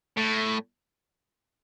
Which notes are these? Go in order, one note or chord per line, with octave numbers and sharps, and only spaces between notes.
A2